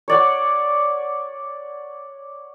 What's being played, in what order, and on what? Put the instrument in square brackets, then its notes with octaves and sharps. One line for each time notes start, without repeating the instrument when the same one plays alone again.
[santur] C#5 D5 F#5